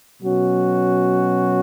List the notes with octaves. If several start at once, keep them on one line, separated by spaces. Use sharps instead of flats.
B2 F#3 C#4 F#4